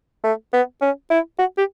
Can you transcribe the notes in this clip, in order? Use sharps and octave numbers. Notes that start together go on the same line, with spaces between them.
A3
B3
C#4
E4
F#4
G4